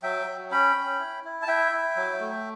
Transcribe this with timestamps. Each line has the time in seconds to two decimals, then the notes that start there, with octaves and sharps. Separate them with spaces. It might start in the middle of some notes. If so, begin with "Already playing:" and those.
0.03 F#3 E5 G5
0.27 F#3
0.51 C#4 G5 B5
0.76 C#4
0.99 E4
1.24 E4
1.42 A5
1.48 E4 E5 G5
1.72 E4
1.97 F#3
2.20 A3